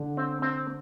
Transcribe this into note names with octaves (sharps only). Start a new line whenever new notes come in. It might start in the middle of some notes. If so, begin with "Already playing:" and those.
Already playing: D3
C4
C4